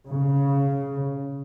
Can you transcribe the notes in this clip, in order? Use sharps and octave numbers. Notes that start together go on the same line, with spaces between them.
C#3